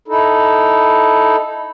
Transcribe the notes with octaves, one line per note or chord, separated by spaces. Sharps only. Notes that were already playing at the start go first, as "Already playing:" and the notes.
D#4 E4 A4